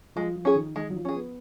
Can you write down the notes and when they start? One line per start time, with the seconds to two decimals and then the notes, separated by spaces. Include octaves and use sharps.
0.16 F3 G#3
0.36 F3
0.45 C#4 G#4
0.55 D#3
0.75 D#3 G#3
0.90 F#3
0.95 F3
1.05 C#4 G#4
1.15 B3